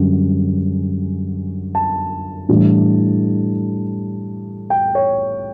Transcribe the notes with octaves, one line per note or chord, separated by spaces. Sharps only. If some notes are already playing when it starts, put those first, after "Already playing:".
Already playing: F#2 D3 G3 C#4
A5
A2 E3 G3 D4
G5
C#5